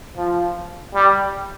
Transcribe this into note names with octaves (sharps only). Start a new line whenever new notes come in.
F3
G3